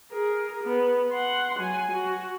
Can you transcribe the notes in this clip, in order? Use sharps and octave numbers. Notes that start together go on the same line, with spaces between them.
G#4 A#4
B3
F#5 C6
F#3 G#5
F#4